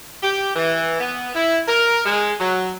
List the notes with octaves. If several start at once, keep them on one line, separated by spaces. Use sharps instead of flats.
G4
E3
B3
E4
A#4
G#3
F#3